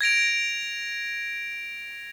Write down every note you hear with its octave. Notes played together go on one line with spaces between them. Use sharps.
G#6 A#6 D7 F7